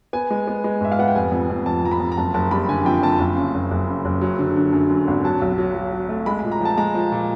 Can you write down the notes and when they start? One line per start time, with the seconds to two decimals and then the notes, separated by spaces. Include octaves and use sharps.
0.13 B3 G#5
0.31 G#3
0.47 B3
0.64 G#3
0.81 G#2 E5
0.92 F5
0.99 B3 F#5
1.08 G5
1.15 F1 G#5
1.32 F2
1.50 F2
1.66 F2 A5
1.84 F2 A#5
1.91 B5
2.00 F2
2.12 A#5
2.17 F#1 A5
2.34 F#1 A5
2.51 G3 B5
2.69 D3 G#5
2.85 F2 G5
3.02 F2 A5
3.19 F#1
3.36 C#3
3.54 F#1
3.71 F#1
3.87 C#3
4.05 F#1
4.21 F#3
4.39 D3
4.57 D3
4.73 F#2
4.90 F#2
5.07 G#1
5.24 F#3 A5
5.42 B1
5.58 F#3
5.75 F#3
5.92 F#3
6.09 A3
6.26 G#3 B5
6.39 A#2 B5
6.52 A#5
6.61 F3 A5
6.77 G#3 A#5
6.95 F3
7.12 A#2